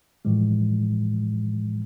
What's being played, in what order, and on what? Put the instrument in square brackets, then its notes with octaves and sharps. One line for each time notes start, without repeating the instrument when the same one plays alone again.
[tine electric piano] A2 E3 F3 G#3